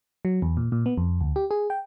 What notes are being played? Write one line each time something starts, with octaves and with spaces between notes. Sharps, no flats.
F#3
E2
A#2
A#2
B3
F2
D2
G4
G#4
G5